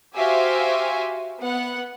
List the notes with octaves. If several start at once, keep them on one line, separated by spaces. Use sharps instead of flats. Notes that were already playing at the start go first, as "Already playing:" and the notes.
F#4 G4 C5 E5 F5 G#5
B3 F#5